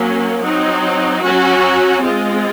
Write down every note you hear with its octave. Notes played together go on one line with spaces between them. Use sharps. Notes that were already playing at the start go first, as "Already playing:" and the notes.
Already playing: F#3 A#3 C#4
F#3 C4 D#4
F#3 C#4 F#4
G#3 C4 F4